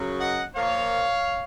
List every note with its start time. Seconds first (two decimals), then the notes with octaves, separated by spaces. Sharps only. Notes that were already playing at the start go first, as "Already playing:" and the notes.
Already playing: F#2 C#3 F#3
0.20 D#5 F#5
0.54 A#2 F3 A#3 C#5 F5